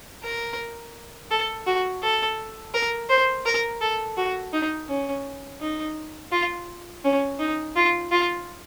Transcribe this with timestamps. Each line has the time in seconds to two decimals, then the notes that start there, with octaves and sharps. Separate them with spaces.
0.23 A#4
1.31 A4
1.67 F#4
2.03 A4
2.74 A#4
3.09 C5
3.46 A#4
3.81 A4
4.17 F#4
4.53 D#4
4.89 C#4
5.61 D#4
6.32 F4
7.04 C#4
7.39 D#4
7.76 F4
8.11 F4